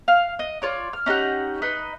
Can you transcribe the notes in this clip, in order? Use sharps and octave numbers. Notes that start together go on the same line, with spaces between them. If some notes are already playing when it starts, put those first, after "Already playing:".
F5
D#5
F4 C#5 D5
F6
C#4 D#4 G4 F#5
D#4 B4 D#5